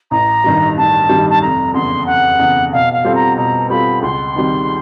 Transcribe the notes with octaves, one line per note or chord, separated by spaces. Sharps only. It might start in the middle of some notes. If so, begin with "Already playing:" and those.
A1 A#5
G2 D#3 G3
A1 A5
G2 D#3 G3
A5
F1 A#5
E2 C#3 C6
F1 F#5
E2 C#3
B2 F5
F5
G3 C4 F4 A4
A#5
B2 A#5
G3 C4 F4 A4 B5
C#2 C6
C3 D#3 G3